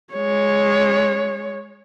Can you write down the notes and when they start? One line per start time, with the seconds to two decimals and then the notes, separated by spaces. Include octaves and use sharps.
0.13 G#3 C#5